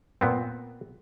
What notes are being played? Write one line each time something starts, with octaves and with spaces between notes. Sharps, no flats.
A#2 B3 C4